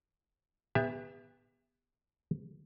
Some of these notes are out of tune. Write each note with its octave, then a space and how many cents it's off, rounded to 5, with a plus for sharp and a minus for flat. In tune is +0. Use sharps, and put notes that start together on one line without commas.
B3 +0 G4 +35 E5 +0